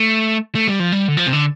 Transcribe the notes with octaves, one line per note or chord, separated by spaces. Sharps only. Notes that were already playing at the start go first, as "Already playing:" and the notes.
Already playing: A3
A3
G3
F3
G3
D3
F3
C3
D3